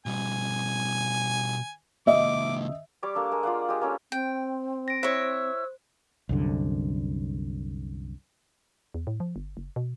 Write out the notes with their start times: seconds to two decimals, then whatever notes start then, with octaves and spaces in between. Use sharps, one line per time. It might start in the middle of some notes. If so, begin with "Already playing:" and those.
0.06 B2 G3 G#5
2.07 C#2 A#3 D#5 E5 D6
3.03 G3 C#5 D5 D6
3.15 A#3 D4 A4
3.31 G#3 A#3
3.43 F4 D5 F5 F#5
3.69 G#3 G4
3.81 A#3 C#4 A4
4.12 C4 G5
4.88 A#6 D7
5.03 E4 C5 C#5 E6
6.29 C2 F#2 D3
8.94 E2
9.07 A2
9.20 F3
9.36 G1
9.57 F#1
9.76 B2